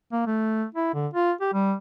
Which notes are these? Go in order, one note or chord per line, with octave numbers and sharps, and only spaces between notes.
A#3
A3
E4
D3
F4
G4
G3